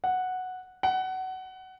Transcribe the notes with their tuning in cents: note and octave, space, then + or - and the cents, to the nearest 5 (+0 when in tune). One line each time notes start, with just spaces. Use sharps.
F#5 -5
F#5 +20